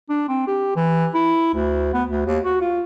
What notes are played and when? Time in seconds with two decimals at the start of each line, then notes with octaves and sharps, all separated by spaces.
0.09 D4
0.29 C4
0.47 G4
0.76 E3
1.14 E4
1.54 D2
1.93 B3
2.09 D2
2.26 D#2
2.45 F#4
2.61 F4